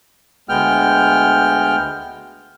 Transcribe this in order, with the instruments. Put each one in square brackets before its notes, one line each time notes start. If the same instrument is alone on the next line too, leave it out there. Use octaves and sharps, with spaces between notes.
[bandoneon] D2 G#3 B3 G5 F6